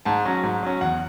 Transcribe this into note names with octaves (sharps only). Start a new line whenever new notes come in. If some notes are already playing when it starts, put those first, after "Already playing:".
G#2 A5
F#3 C#4
G#2
F#3 C#4
E2 F#5